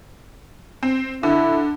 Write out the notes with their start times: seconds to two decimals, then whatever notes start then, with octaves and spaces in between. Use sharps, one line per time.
0.83 C4
1.23 D3 E4